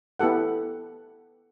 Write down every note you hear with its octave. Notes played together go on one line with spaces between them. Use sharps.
B3 E4 G4 A4 F#5